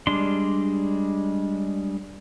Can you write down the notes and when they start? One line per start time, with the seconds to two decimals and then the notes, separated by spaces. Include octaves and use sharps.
0.07 G3 G#3 D4 C6